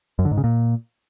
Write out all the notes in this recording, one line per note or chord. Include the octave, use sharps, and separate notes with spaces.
F#2
D3
G#2
C#3
A#2